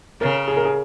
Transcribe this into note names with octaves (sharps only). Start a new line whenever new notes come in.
C#3 A#4
G#4
A#4
G#4